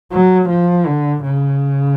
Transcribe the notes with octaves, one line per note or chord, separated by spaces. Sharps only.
F#3
F3
D3
C#3